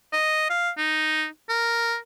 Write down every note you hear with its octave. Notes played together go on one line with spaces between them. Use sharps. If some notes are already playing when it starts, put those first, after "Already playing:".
D#5
F5
D#4
A#4